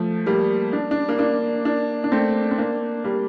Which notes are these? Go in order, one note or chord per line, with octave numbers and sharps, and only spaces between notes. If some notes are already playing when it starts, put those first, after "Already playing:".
Already playing: F3 A3
G3 A#3
D4
D4
A#3 D4
A#3 D4
A#3 D4
D4
A3 C4
C4
A#3 D4
G3 A#3